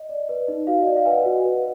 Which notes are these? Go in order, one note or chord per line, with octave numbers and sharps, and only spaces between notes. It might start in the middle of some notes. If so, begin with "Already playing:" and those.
Already playing: D#5
D5
B4
D#4
F#4 F5
D5 D#5
F5
B4 G#5
D#5 F#5
F#4
B4